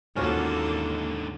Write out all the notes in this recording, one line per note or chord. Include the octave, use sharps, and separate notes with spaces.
D#2 G#2 D3 A#3 C#4 F4 F#4 A4